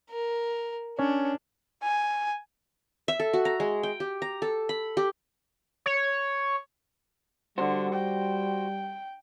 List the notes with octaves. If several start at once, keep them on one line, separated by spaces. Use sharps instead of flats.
A#4
C#4 D4 C#5
G#5
E5
A4
F#4
A#5
G#3
G5
G4
A#5
A4
B5
G4
C#5
D3 G3 F#4 C5
G5